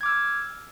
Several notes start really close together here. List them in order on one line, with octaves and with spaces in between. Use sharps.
G#6 D6 F6 E6